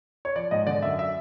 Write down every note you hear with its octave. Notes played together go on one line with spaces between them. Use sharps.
C#5
F3 D5
G#2 D#5
D3 D5
F#2 E5
E5